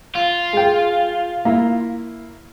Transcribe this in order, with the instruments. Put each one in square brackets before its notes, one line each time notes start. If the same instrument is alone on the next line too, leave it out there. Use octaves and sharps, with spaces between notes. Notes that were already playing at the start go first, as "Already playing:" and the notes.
[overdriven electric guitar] F4
[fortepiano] G#3 G5
A#3 E4